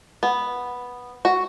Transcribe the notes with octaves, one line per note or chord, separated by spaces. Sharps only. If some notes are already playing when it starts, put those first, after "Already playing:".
B3
F#4